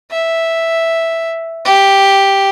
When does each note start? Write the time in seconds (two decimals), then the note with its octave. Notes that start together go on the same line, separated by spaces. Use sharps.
0.11 E5
1.65 G4